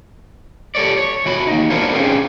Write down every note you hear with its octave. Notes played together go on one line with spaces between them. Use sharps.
G4 A4 C#5 D5
C#5
E3 F#4 B5
A#3 D#4
B3 D4 E4 A#4 C5 C#5
C4 C#4 F4 G4 G#4